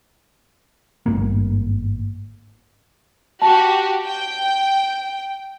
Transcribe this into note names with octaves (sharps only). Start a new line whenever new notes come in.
G#1 G2 A3 A#3
F#4 G4 A5
G5